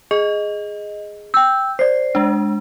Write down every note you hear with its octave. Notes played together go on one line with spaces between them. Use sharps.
G#4 D#5
G5 E6 G6
C5 D5 C7
G#3 D4